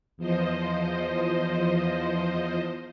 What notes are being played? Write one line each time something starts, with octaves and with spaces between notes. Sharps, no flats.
E2 F3 C5 D#5